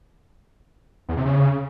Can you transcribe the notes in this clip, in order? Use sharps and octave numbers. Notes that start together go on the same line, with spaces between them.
E2
C3
C#3